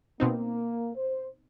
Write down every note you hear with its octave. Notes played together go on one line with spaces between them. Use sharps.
B2 A#3 C4 D#4
C5